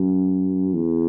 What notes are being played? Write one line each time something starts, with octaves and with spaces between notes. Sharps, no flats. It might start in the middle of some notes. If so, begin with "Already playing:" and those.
Already playing: F#2
E2